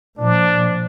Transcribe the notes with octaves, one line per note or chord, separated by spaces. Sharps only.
A#2 F3 D4